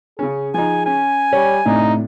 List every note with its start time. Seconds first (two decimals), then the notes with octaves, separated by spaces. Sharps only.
0.19 C#3 C#4 G#4
0.54 F3 D#4 G#5
0.86 C#4 G#5
1.33 G3 C#5
1.66 A2 C3 D4 D#4